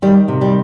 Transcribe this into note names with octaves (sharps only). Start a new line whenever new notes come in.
D#3 G3
C3
G3